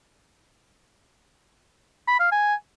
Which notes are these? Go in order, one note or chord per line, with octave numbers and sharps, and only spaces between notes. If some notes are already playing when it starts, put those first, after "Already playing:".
B5
F5
G#5